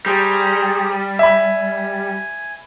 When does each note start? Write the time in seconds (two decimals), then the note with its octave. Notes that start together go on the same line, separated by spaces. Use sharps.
0.06 G3 G#4 C5 A#5
1.19 E5 G#5 B5